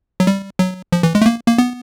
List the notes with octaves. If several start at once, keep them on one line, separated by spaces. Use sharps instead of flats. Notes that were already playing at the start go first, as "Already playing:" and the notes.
F#3
G3
F#3
F3
E3
G#3
A3
A#3
A#3
B3